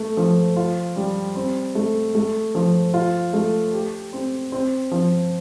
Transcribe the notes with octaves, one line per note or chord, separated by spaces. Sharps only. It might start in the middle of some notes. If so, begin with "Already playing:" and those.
Already playing: A3
F3
F4
G3
C4
A3
A3
F3
F4
A3
G4
C4
C4
F3